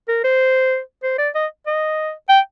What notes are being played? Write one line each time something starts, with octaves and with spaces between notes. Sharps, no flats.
A#4
C5
C5
D5
D#5
D#5
G5